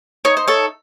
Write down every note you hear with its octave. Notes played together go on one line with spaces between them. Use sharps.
D#4 C#5
C5
A4 C#5